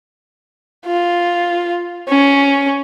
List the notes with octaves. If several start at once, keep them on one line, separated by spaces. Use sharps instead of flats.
F4
C#4